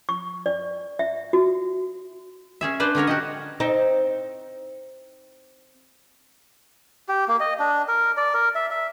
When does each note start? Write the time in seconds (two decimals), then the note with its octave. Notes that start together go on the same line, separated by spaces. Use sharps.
0.09 C#6
0.46 D5
0.99 E5
1.33 F#4
2.61 C#4 G#4 E5
2.80 D4 B4 C5 D5
2.95 D3 C#4 A#4 C#5
3.07 F#4 G4 D#5
3.60 C4 D#4
7.09 G4
7.28 A#3
7.40 D#5
7.60 D4
7.88 A#4
8.17 D5
8.34 A#4
8.55 E5
8.71 E5